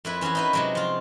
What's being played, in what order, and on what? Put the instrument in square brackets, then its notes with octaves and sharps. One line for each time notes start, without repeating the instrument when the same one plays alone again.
[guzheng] F2 E4 B4
E3 C#4 F#4 G#4 G#5
D#4 E4 B4
C3 F#3 G#3
F3 F4